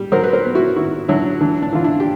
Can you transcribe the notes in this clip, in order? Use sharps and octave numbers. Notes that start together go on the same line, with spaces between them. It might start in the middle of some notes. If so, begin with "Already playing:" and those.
Already playing: G3
F#3 A#4 C5
B4
A#4 C5
B3
E4 F#4
D#3 E4 F#4
F#3 D4 E4
E3 D4
D4
E3 F4
D4 E4
G4